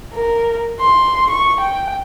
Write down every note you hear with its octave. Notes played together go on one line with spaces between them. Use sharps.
A#4
C6
C#6
G5